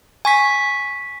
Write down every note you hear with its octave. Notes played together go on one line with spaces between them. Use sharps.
G#5 C#6 B6